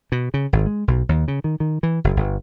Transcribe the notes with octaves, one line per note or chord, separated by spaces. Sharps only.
B2
C#3
G#1
G#3
B1
D#2
C#3
D#3
D#3
E3
F#1
G1